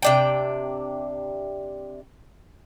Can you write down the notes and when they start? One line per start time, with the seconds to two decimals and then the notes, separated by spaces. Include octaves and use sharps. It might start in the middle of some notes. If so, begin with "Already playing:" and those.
0.02 C3 D4 G5